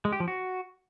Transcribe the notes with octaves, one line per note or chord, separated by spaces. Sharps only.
G#3
G4
F3
F#4